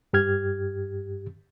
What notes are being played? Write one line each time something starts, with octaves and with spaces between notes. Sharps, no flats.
G2 G4 F6 G#6